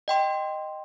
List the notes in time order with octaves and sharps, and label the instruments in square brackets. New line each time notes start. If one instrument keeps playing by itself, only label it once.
[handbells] D#5 G5 C6